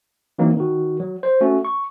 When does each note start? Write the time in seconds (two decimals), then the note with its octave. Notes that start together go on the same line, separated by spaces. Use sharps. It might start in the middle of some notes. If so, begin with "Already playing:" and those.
0.39 E3 F#3 A#3 C4 D#4
0.57 D#3 F#4
1.00 F#3
1.23 C5
1.41 A3 C#4 F#4
1.65 C#6